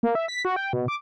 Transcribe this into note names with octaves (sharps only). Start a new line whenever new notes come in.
A#3
E5
B6
F#4
G5
B2
D6